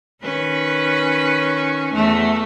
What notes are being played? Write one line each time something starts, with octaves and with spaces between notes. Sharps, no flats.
D#3 C#4 B4
E2 A3